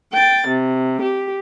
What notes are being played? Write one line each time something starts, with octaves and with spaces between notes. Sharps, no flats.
G5 A6
C3
G4